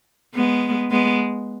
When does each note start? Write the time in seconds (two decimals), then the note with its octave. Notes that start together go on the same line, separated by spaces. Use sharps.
0.35 G#3 B3
0.91 G#3 B3